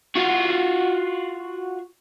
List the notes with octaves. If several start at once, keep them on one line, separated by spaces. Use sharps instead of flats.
F4 F#4